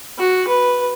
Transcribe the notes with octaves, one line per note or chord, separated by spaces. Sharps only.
F#4
B4